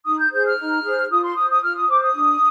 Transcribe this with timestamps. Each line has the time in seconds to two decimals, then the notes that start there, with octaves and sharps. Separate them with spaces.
0.05 D#4 D#6
0.18 G6
0.31 G#4 C5 G6
0.45 F6
0.58 D#4
0.85 G#4 C5
1.10 F4 D#6
1.23 C6
1.36 C5 D#6
1.50 D#6
1.62 F4 F6
1.75 D#6
1.88 C5 D6
2.02 D#6
2.14 D4